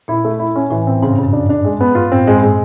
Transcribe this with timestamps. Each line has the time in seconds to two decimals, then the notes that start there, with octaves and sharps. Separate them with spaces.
0.08 A#2 E4
0.25 A3
0.39 E4
0.56 C#4
0.70 A2 E3
0.87 C4
1.02 G#2 C#3
1.12 G2
1.18 F#2 C#3
1.33 D4
1.49 D4
1.64 G#3
1.81 B3
1.95 G2 F4
2.11 A2 C4
2.25 G#2 G#3
2.38 G2 G#3